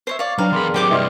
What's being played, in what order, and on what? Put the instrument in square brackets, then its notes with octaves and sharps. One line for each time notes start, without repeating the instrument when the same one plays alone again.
[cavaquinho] C5 C#5 E5
[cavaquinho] C#5 D5 [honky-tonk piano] F5
[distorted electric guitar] F#3 [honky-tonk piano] D4 B4 D5 [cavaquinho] F5 [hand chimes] G5 A#5
[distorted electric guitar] E2 B5 [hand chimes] G#4 A#4 C6
[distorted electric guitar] F#3 C4 [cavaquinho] G4 G5 D6
[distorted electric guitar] G2 C3 [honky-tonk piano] E4 D#5 C6 [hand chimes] B4 D5 F6